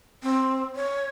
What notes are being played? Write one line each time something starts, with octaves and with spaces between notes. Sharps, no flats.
C4
C#5